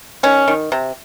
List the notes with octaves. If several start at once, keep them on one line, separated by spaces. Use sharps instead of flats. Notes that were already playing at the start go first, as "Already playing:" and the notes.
D#3 C#4
D#3
C3